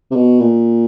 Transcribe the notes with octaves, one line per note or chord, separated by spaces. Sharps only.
C3
B2
A#2